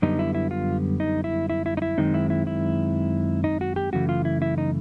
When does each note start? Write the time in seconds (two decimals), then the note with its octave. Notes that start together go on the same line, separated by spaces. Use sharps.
0.02 F#2 D3 G3 B3 D#4
0.19 E4
0.35 E4
0.51 F4
1.00 D#4
1.24 E4
1.50 E4
1.66 E4
1.77 D#4
1.82 E4
1.98 F#2 D#3 G#3 C4 D#4
2.14 E4
2.30 E4
2.47 E4
3.44 D#4
3.61 F#4
3.76 G4
3.93 F#2 C#3 E3 A3 F#4
4.09 F4
4.25 E4
4.42 E4
4.58 D#4